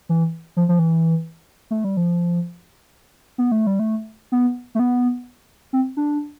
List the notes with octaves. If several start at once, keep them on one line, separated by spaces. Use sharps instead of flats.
E3
F3
F3
E3
A3
G3
F3
B3
A3
G3
A3
B3
A3
B3
C4
D4